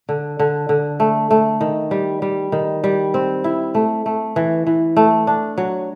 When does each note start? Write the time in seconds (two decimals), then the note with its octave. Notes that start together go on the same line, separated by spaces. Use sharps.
0.09 D3
0.39 D3
0.69 D3
1.00 A3
1.31 A3
1.61 D#3
1.91 G3
2.22 G3
2.52 D#3
2.84 G3
3.14 C4
3.44 E4
3.75 A3
4.06 A3
4.36 E3
4.67 E3
4.97 A3
5.27 D4
5.58 F#3